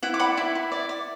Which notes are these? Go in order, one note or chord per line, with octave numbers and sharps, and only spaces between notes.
E4 F#5
D6
D5 F#5 B5
E4 E5
E4
D5
D5